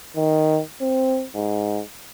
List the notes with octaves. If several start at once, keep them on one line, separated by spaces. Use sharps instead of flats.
D#3
C4
G#2